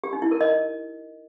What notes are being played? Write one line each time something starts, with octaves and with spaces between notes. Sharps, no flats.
G4
D#4
E4
A#4
D#5